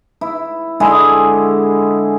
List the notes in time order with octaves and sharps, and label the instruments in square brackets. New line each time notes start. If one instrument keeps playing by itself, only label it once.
[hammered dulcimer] E4
D3 G#3 E4 G#4